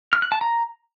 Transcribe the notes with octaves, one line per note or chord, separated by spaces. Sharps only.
F6
F#6
A5
A#5